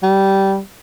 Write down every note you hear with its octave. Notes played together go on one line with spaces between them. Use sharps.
G3